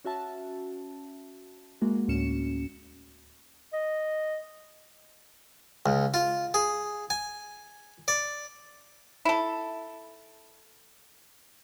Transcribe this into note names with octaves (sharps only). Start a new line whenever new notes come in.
C#4 F#4 E5 A5
G#3 A#3 F#4
D2 A2 C#4 C#7 E7
D#5
C#2
F4
G#4
G#5
D5
E4 A4